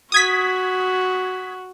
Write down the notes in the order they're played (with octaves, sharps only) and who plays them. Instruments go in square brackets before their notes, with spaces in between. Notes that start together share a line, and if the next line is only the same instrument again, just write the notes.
[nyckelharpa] F#4 [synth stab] D#6 G#6 B6